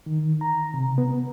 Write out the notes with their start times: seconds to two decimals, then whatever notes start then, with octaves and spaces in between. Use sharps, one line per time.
0.06 D#3
0.41 A#5
0.74 C3
0.98 B3